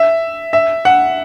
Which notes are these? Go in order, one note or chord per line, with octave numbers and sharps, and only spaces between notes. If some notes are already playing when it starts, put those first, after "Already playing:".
Already playing: E5
E5
F#5